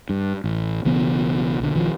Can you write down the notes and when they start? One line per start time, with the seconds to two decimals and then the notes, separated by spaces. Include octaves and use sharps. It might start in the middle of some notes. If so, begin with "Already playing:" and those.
0.09 G2
0.44 A1
0.85 B1 C#3 E3 B3
1.60 B1 D3
1.75 B1 D#3 F3